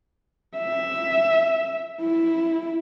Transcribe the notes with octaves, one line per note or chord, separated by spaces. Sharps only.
E5
E4